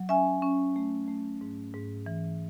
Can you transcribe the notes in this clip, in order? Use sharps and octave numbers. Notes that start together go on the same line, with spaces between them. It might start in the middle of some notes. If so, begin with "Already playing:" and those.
Already playing: F#3
C#4 E5 G#5
C#4
A3
A3
G#2
G#2
E3